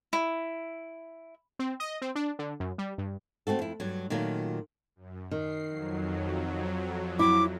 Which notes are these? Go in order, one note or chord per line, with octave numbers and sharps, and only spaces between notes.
E4
C4
D#5
C4
D4
D3
F#2
G3
G2
A3 C4 F#4 A4
F2 E4
G2 F#3
A#2 D#3 F#3 A3 F4
F#2
D#3 C7
F2 F#3
E4 D6